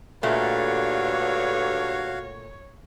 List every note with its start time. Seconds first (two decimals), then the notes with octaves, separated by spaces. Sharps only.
0.23 G2 A#2 D3 A3 F#4 C#5 F5